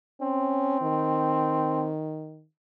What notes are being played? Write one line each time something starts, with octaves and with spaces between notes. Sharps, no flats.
C4 C#4
D#3